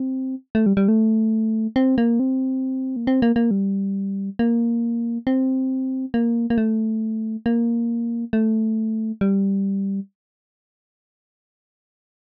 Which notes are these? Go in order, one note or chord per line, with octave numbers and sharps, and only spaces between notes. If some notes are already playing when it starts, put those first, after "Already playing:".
Already playing: C4
A3
G3
G3
A3
C4
A#3
C4
A#3
C4
A#3
A#3
G3
A#3
C4
A#3
A#3
A3
A#3
A3
G3